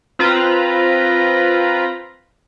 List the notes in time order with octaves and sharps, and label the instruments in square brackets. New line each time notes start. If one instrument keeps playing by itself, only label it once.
[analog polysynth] C4 F4 B4 A#5 B5